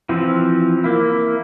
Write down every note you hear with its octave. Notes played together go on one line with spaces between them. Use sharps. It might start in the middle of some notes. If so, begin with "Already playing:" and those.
E3 F3 C4
A#3 E4